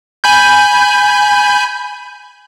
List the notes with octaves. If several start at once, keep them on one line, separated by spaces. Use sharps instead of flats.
G#5 B5 G6